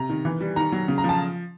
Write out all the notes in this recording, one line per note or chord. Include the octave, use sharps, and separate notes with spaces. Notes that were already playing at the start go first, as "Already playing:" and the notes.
Already playing: C3 A#5
D#3
E3
G3
D#3 A#5
F#3
C#3
A#5
F3
A5